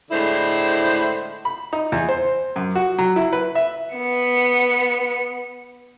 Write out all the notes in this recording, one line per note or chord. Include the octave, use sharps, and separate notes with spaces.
A2 D3 G#3 E4 C5
B5
D#4
E2
C5
F#2
F#4
F#3
E4
B4
E5
B3 C#7